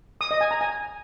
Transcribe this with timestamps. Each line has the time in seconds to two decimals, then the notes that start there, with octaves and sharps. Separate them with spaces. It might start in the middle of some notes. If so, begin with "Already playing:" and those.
0.21 D#6
0.31 D#5
0.41 G#5
0.51 A#5
0.61 G#5